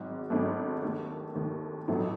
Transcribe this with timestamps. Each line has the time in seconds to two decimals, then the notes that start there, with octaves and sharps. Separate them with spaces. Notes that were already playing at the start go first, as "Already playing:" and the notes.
Already playing: G#1 G#2 F#3
0.30 G#1 G#2 F#3 A3
0.82 D#2 D#3 A3
1.35 D#2 D#3 A3
1.88 A1 A2 F#3 A3 D#4